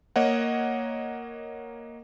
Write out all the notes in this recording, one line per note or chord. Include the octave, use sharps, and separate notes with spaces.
A#3 C#5 D#5 F#5